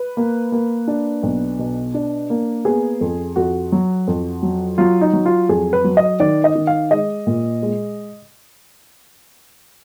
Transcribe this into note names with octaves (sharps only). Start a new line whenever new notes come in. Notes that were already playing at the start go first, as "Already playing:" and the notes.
Already playing: B4
A#3
A#3
D4
B1
B2
D4
A#3
B3 G#4
F2
F2 F#4
F#3
F2
F#3
F#3 F4
D#4
F#3
F4
F2 G#4
B4
F#3
D#5
D#3 D5
D#5
D#3
F5
G#3 D#5
A#2
G#3